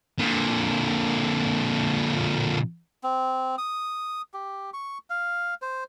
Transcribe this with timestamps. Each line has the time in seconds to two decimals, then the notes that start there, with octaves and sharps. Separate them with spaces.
0.19 A#2 D3
3.04 C4
3.58 D#6
4.34 G4
4.73 C#6
5.10 F5
5.62 C5